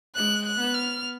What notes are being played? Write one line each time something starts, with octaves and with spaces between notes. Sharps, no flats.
G#3 F#6
F#6
B3
F6